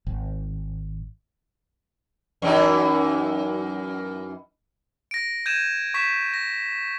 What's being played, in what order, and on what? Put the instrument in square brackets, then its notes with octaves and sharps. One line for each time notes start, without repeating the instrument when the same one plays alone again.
[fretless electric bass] G#1
[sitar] F#2 E3 D#4
[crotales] A#6 D7
G6 G#6 D#7 E7
C#6 B6 E7
A#6